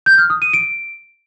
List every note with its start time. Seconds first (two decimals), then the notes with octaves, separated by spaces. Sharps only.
0.06 G6
0.18 F6
0.30 D#6
0.42 D#7
0.53 D7